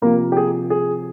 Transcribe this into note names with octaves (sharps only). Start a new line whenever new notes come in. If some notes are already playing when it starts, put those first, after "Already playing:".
C3 F3 A#3 A#4
G4
G#4
G#4